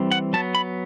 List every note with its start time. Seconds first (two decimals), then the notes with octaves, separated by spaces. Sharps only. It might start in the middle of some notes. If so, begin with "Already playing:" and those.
Already playing: E3 G3 C4
0.11 F#5
0.33 F#3 B3 A5
0.55 B5